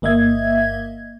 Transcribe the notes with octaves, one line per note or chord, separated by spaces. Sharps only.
G1 A#3 D#5 E5 G#6